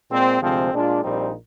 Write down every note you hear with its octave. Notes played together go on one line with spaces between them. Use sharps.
A#2 G#3 C4
D2 C3 F3 G#3 C4
A#2 G#3 D4 F4
A#1 A#2 G3 C4 D#4